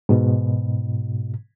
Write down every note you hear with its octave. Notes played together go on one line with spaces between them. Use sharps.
G#2 B2